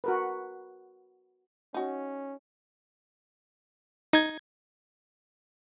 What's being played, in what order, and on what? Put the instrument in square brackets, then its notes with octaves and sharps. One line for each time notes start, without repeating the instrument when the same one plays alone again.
[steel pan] F#4 A#4 B4
[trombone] C#4 [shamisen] D#4 F#4
[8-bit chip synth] D#4 G#6